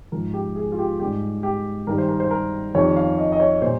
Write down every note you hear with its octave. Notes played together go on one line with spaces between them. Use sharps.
G#2 F3 A#4
G4
G#4
F4
G4
G#2 G3 G4
G4
G2 D#3 G3 A#4
C5
A#4
C5
A#4
F2 D#3 G3 C#5
F5
D#5
D#5
C#5
A#2 G3 C5